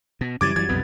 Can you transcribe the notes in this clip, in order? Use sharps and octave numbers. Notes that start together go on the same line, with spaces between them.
B2
F#2 C#3 E3 G3 D6 G#6 A6
E3 F#3 G#6
B1 F2 C3 B3